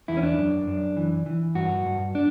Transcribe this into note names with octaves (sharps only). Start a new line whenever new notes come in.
E2 E4
C#4
D4
F#2
F#2
E3
E3
G2 F#4
G2
D4